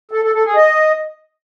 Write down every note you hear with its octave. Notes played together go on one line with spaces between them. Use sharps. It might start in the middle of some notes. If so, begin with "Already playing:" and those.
A4
A4
A4
G#4
D#5